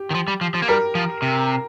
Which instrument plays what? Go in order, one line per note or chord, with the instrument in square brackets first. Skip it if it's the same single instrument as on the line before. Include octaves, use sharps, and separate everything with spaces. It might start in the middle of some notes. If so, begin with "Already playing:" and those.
Already playing: [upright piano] G4
[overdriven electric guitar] D#3
F3
G3
F3
F3
A#3
[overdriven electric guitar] G3 [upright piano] A#4
[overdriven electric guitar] F3
C3